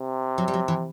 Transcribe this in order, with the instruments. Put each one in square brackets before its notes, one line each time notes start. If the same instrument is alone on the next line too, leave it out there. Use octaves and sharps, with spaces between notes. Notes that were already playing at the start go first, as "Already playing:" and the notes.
Already playing: [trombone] C3
[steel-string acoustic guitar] F#3
G3
F#3
E3